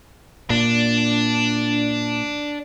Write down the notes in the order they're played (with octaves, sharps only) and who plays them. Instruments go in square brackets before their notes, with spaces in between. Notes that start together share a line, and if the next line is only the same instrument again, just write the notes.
[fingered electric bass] A#2 [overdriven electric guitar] D4